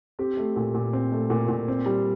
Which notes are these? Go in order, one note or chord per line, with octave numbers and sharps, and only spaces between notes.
C4 G4
A3
A#2
A#2
C4
A3
A#2
A#2
C4
G3